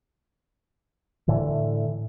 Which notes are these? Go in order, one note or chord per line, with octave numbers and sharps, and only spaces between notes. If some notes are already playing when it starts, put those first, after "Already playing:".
A2 D3 E3